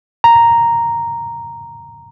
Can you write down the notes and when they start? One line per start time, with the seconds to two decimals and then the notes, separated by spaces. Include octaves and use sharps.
0.24 A#5